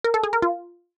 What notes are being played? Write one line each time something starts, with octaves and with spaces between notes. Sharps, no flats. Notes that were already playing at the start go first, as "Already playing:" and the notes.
A#4
A4
G#4
A#4
F4